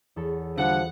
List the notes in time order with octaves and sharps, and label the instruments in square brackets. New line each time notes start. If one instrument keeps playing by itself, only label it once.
[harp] E2 A4 C#5
[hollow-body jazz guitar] D3 G3 [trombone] F3 [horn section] F#5